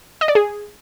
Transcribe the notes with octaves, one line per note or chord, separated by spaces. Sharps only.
D#5
D5
G#4